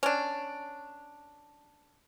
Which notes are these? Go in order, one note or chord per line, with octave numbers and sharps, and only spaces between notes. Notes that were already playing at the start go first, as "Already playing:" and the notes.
C#4 D4